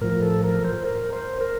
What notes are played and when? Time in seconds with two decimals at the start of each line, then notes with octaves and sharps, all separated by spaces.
0.01 A2 F3 A#4
0.22 A4
0.44 A#4
0.65 C5
0.85 A#4
1.13 C5
1.41 A#4